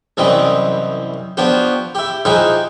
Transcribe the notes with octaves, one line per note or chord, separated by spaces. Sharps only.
C2 F#2 E3 G3 C4 D#5
F3 B3 D4 F#4 G4
E4 G4
F3 D#4 E4 G4 G#4 B4